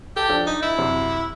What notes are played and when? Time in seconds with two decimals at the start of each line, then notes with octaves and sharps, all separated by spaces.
0.16 G4 A4 A5
0.29 F3 D4 A4
0.46 D#4
0.62 E4
0.78 F#2 C3